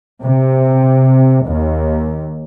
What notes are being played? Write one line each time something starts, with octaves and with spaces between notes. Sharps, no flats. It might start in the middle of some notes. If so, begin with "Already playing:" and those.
C3
D#2